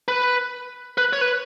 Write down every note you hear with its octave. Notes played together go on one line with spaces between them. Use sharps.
B4
B4
C#5
B4